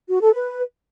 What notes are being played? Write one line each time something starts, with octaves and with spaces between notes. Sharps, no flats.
F#4
A4
B4